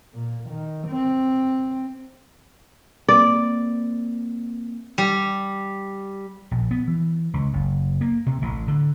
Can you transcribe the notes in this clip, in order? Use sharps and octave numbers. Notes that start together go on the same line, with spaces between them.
A#2
D#3
C4
A#3 C4 D5
G3
A#1
B3
E3
C#2
F#1
A#3
C3
A1
D3